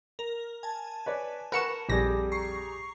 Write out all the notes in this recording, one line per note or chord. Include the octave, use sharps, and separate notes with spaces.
A#4
G#5 A5
B4 C#5 D5
A#4 B4 F#5 C#6 C#7 E7
A#1 F2 G3 G4 G#4 A#6
A#5 C#6 C7